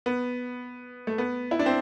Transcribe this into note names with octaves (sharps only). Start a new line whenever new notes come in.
B3
A3
B3
E4
D4
C4